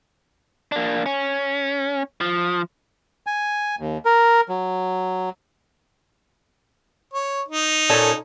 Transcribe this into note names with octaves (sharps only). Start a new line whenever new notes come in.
A#3 D4
C#4
F3
G#5
D#2
A#4
F#3
C#5
D#4
A#2 C#4 A4